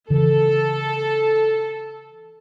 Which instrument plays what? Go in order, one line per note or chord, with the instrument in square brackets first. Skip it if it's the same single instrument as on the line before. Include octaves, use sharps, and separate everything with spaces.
[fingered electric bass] C#3 E3 [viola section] A4